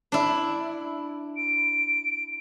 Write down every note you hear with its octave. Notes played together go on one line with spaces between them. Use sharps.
D4 E4
D7